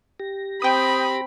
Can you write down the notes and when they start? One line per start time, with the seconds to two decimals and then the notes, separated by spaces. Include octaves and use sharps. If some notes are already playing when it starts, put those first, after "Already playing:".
0.20 G4 A#6
0.62 C4 G5 B5 D#6